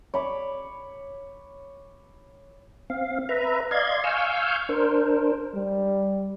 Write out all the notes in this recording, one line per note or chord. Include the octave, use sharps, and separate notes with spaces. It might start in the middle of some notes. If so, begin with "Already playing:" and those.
C#5 B5 D6
C4 F5
B4 E5 A#5
D5 D#5 F5 C6 G#6
F5 G#5 C#6 E6 F6 G6
D4 A#4 C5
G3